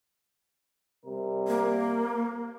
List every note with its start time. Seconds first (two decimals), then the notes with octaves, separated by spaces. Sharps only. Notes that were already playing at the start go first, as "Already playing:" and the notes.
1.06 C3 G3 A#4
1.48 A#3